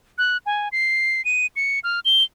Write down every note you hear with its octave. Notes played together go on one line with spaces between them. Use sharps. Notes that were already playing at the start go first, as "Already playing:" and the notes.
F#6
G#5
C7
D#7
C#7
F6
G7